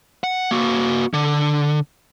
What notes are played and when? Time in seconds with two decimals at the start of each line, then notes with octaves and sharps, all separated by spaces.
0.24 F#5
0.51 A#3 F#4
1.14 D3